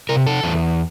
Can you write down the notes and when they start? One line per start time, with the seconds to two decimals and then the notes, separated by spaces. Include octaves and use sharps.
0.09 C3 A#4
0.27 A4
0.43 E2